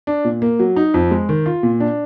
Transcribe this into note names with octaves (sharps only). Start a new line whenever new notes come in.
D4
A#2
A#3
F#3
D#4
F2
G#3
D#3
F4
A#2
D4